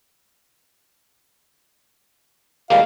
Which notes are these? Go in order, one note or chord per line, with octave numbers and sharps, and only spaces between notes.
G3 G#3 A#3 F5